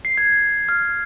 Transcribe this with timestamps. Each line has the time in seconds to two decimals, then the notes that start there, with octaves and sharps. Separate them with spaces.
0.05 C7
0.17 G#6
0.69 F6